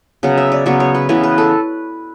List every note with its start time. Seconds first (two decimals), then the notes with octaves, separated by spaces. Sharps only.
0.23 C#3 F#3 B3 F#5
0.38 E5
0.52 D5
0.66 C#3 F#3 B3 C#5
0.80 C#5
0.95 B4
1.09 C#3 E3 B3 B4
1.23 B4
1.38 A4